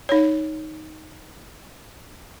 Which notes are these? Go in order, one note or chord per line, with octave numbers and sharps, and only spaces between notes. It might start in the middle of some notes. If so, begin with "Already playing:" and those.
D#4 C#5